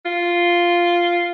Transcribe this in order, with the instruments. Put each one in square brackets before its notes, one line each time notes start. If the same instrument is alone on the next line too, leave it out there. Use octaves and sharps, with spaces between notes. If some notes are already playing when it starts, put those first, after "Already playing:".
[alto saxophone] F4